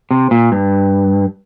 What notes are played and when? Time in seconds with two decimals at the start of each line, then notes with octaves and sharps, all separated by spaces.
0.11 C3
0.31 A#2
0.52 G2